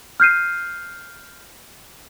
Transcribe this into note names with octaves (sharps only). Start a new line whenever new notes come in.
F6 G6 C7 D#7